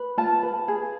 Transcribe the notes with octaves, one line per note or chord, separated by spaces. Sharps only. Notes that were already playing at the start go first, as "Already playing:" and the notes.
Already playing: B4
F4 A5
B4
G#4